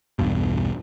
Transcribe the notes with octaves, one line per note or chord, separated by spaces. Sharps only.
B1 E2 G2 B2